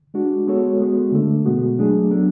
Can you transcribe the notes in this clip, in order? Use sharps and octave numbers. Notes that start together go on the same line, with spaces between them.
G#3 D4 F#4
G#3 B3 F#4 A4 C#5
G#3 B3 F#4
D3 A3 D4 A4
B2 G#3 B3 F#4
F#3 A3 D4 G#4
F#3 B3 D4 A4